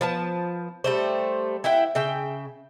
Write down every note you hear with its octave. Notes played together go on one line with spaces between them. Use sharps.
F3 B3 A5
G3 A3 C5
E4 E5 F#5 G5
C#3 E5 G5